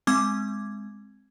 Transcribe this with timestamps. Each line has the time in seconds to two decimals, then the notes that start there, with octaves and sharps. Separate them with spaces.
0.07 G#3 C4 D6 G#6